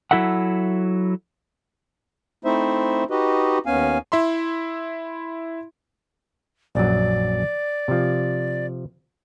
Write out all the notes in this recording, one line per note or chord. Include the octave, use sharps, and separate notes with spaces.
F#3 E4 A4 E5 F#5
A3 C4 D#4 E4 C5 E5
D#4 F#4 G4 B4 D#5
D#2 B3 C#4 F5 G#5
E4 E5 B5 C6
A#1 F#2 F#3 D5
C3 F3